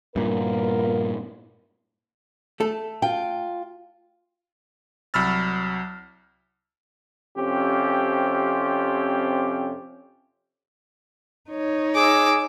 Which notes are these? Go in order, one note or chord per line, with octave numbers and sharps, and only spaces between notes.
G2 A#2 B3 F4 A#4
A3 A4
F4 G5
C2 F#3 B5 E6 F6 A6
F2 C3 C4 C#4 G4
D#4 C#5
G#4 D6 E6